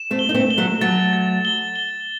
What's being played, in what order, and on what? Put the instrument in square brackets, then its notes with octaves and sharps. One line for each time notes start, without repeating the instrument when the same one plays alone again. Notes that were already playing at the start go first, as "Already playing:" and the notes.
Already playing: [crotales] E7
[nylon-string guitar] A3 C4
[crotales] G7
[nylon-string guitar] D#4
A3 C4
[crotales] G7
[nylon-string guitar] F#3 A3
[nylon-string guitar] F#3 A3 [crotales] A6
[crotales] A6
G7
G7